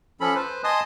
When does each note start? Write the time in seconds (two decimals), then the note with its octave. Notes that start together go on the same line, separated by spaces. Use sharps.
0.20 F3 C#4 A4 B5
0.35 B4 C5
0.64 D#5 G#5 A5 C6 D#6